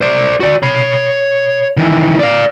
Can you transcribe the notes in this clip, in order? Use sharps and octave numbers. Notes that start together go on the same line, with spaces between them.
C5 D5
F#4 D5
C#5 B5
D#3 E3
D5 F5